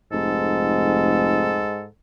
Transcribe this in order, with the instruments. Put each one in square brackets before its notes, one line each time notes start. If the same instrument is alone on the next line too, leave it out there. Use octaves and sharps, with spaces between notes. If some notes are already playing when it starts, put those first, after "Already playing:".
[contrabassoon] F1 [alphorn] G#2 [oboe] A4